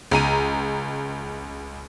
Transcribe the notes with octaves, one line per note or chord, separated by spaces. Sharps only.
C#2 A#5 D#7